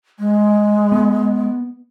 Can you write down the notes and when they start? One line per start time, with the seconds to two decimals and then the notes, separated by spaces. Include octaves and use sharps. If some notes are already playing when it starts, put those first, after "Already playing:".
0.19 G#3
0.92 B3